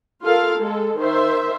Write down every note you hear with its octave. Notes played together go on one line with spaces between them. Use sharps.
F4 A4 A#4 F5
G#3 A4
D#3 C5 E5